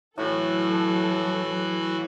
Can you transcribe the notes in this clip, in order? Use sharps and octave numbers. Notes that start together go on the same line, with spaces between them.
A2 E3 F#3 F#4 A4